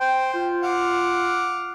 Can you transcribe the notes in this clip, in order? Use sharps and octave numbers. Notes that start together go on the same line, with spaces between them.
C5 G5
F4
F5 F#5 D6